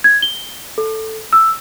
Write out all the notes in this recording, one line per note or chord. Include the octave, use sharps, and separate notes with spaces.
G#6
G7
A4
E6